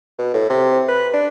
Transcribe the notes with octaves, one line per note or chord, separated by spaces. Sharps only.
B2
A2
C3
B4
D4